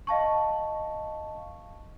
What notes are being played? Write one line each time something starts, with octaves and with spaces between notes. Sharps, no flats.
D#5 F5 A5 C#6